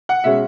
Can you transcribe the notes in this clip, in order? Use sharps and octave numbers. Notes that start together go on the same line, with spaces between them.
F#5
B2 G#3 C#4 E5